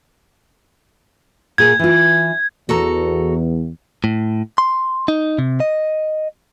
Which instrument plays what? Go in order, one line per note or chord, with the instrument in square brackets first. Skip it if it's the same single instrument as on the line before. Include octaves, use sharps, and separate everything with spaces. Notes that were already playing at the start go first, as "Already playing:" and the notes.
[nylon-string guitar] A#2 G#4 A#4 [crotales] G#6
[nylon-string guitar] E3 F4
[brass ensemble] E2 [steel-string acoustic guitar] F#4 A4 A#5
[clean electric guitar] A2
C6
D#4
C3
D#5